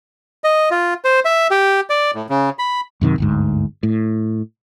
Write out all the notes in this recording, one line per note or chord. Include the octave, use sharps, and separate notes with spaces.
D#5
F4
C5
E5
G4
D5
A2
C#3
B5
F#2 C3 D#3
G1 D2 G#2
A2